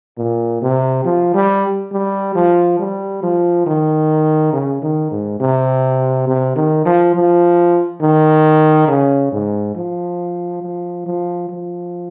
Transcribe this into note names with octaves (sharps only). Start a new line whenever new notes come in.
A#2
C3
F3
G3
G3
F3
G3
F3
D#3
C#3
D#3
G#2
C3
C3
D#3
F3
F3
D#3
C#3
G#2
F3
F3
F3
F3